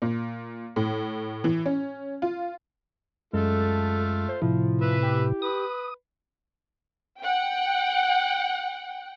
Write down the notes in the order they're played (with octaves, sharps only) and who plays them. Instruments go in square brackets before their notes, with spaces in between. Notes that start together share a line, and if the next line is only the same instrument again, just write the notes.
[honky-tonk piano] A#2
A2
E3
C#4
F4
[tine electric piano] F#2 G#3 [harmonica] A3 F4 [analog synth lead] A4
[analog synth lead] C5
[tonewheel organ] A2 C3 [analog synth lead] F3 [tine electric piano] E4
[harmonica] B4 E5
[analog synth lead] G4
[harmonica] B4 [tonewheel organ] D#6
[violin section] F#5 G5